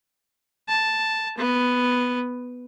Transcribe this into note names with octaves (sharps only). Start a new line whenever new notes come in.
A5
B3